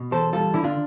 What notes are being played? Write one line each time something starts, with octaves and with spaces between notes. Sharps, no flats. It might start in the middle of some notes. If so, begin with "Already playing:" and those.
Already playing: B2
E2 A4 C5
G3 F4 A4
D3 E4
D4 F4